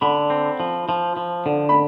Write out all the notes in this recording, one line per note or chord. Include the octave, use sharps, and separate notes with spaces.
D3 B5
C4
F3
F3
F3
D3
B5